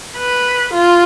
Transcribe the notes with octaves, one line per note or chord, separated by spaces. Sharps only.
B4
F4